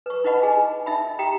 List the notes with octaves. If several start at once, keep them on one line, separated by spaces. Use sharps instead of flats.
B4 C#6
D#4 E4 B4 D#5 F#5 B5
D#4 G#4 G#5
D#4 E5 B5
G4 G5 A#5